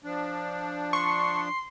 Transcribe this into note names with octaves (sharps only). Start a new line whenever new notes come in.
F3 D4
C6 C#6